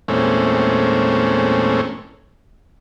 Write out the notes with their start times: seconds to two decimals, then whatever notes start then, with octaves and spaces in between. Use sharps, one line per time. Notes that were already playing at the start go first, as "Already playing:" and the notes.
0.08 E2 A#2 G#3 A3 C4 C#4